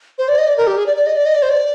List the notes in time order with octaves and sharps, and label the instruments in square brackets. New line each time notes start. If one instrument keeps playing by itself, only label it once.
[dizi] C5
D5
D#5
D5
A#4
G4
G#4
D5
D5
D#5
D5
D#5
D5
C5
D5